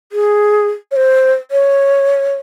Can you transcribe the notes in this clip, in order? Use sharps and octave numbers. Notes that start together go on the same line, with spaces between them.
G#4
C#5
C5
C#5